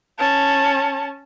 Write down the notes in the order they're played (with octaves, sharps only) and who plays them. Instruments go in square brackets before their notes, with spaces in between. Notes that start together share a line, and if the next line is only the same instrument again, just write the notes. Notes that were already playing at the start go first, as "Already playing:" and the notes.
[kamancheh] C#4 A5